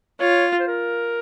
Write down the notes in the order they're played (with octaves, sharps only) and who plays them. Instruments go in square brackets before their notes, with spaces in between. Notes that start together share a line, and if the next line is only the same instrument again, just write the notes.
[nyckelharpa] F4 [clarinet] C#5
[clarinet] C5
A#4